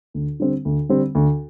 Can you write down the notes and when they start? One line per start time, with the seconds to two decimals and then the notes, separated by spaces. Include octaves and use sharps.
0.14 D2
0.40 D3 G3 C4
0.65 D2
0.89 D3 G3 C4
1.15 D2